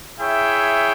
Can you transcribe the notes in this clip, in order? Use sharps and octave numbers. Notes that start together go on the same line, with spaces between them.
E4 G#4 C#5 E5 G5